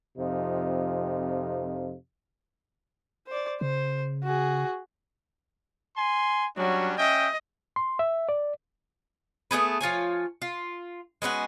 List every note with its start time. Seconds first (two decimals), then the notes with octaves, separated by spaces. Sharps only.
0.18 F2 C3 F3 D#4
3.27 C5 D5
3.61 C#3 C5
4.24 F#4 G#4
5.97 G#5 C6
6.57 F#3 G3 C#4 D4
6.98 C#4 D#5 E5 G5
7.76 C6
7.99 E5
8.29 D5
9.51 A3 B3 G#4 B4
9.81 F3 F4 C#5 G#5
10.42 F4
11.22 G#3 B3 C#4 F#4